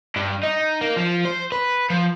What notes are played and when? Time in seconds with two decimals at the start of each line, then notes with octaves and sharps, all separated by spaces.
0.16 G2
0.43 D#4
0.81 A#3
0.97 F3
1.25 C5
1.52 B4
1.90 F3